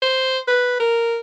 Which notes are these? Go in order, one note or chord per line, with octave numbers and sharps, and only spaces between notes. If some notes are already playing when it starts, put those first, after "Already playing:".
C5
B4
A#4